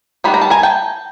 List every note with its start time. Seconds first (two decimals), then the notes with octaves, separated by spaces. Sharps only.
0.24 D#3 G3 B3 D4 B5
0.34 A#5
0.41 A5
0.50 G#5 A#5
0.63 G5 A5